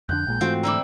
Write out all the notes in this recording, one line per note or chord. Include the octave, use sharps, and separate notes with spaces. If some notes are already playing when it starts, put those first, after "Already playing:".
F2 D3 D4 F#6 G6
A#1 A#2 G#3
G#2 E3 A3 C4 F4 F#4
D3 G3 E4 A#5 D6 E6